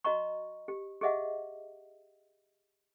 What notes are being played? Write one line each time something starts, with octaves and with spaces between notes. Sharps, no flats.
F#4 D#5 A#5 C#6
G4
G4 G#4 D#5 E5 F#5